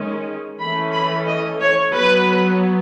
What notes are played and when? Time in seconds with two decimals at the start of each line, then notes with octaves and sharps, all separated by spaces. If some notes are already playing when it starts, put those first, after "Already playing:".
Already playing: D#3 G#3 C#4
0.59 E3 A3 C#4 B5
0.93 B5
1.26 D#5
1.60 C#5
1.94 F#3 B3 B4